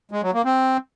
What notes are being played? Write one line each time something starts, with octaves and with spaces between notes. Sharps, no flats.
G#3
F#3
A#3
C4